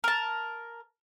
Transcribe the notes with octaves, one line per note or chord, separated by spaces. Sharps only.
A#4 A5